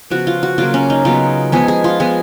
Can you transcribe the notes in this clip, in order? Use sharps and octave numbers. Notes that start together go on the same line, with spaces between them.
C#3 F3 B3 F#4
F4
F#4
C#3 F#3 A#3 F4
C#4
D#4
C#3 F#3 B3 F4
F3 G#3 B3 G#4
G#4
F4
F3 G#3 B3 G#4